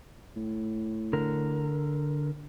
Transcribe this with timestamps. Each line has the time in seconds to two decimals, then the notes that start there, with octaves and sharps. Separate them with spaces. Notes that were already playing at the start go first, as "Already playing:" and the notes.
0.36 A2
1.13 D3 A#4